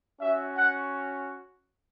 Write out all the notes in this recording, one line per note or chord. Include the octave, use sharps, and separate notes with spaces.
C#4 F#4 E5
F#5